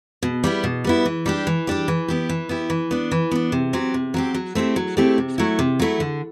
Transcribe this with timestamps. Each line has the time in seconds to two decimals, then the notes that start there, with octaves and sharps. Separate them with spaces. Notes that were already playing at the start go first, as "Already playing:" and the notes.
0.23 B2
0.44 G3 B3 E4
0.64 B2
0.84 G3 B3 E4
1.05 E3
1.26 G3 D4 G4
1.47 E3
1.67 G3 D4 G4
1.88 E3
2.08 B3 E4 G4
2.29 E3
2.49 B3 E4 G4
2.70 E3
2.91 B3 D4
3.11 E3
3.31 B3 D4
3.52 C3
3.73 F#3 C4 G4
3.94 C3
4.14 F#3 C4 G4
4.34 F#3
4.55 A3 C4 E4 G4
4.76 F#3
4.97 A3 C4 E4 G4
5.18 C3
5.38 F#3 A3 E4
5.59 C3
5.79 F#3 A3 E4
6.00 D3